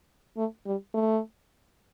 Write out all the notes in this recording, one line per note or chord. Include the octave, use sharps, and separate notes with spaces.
A3
G3
A3